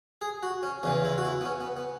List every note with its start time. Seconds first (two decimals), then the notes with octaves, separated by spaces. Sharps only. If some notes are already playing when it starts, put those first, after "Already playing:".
0.21 G#4
0.43 F#4
0.63 C#4
0.83 E2 C#3 E3 C#4
1.05 E4
1.18 F#4
1.25 E4
1.41 B3
1.45 C#4
1.60 B3
1.77 B3